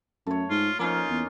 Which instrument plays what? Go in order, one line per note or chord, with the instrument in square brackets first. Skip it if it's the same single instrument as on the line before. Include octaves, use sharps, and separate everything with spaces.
[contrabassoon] F#2 [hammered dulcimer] A3 C#5
[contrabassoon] G#2 [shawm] F4
[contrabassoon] F3 [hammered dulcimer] A#3 C#4 D#4 [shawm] F4
[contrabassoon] E2